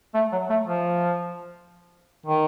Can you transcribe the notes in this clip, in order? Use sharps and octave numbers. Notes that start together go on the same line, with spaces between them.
A3
F#3
A3
F3
D#3